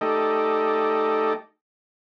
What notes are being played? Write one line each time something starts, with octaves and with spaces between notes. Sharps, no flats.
A3 D#4 G4 A4 D5 D#5